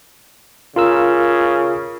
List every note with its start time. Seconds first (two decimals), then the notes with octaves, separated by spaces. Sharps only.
0.76 C#3 F4 A#4 E6